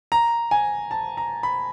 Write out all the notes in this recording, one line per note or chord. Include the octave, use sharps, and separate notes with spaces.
A#5
G#5
A5
A#5
B5